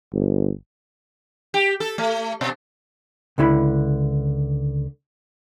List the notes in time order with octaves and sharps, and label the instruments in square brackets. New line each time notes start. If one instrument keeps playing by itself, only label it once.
[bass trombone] G1
[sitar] G4
A4
A3
B2
[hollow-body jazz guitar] C#2 D3 E4 B5